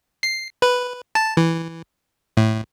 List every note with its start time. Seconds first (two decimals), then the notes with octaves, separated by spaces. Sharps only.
0.23 C7
0.62 B4
1.15 A5
1.37 E3
2.37 A2